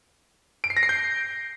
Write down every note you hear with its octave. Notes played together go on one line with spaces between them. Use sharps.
D7
C7
A#6
C7
G6